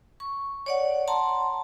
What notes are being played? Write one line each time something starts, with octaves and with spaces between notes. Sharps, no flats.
C#6
C#5 D5 F#5
F#5 A5 A#5 C6